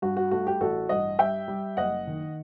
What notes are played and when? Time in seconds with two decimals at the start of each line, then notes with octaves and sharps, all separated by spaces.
0.02 G2 F#4
0.17 F#4
0.31 A3 F#4
0.47 G4
0.61 A1 F#4 A4
0.89 G2 D#5 F#5
1.19 G3 E5 G5
1.48 G3
1.77 F#1 D#5 F#5
2.07 D#3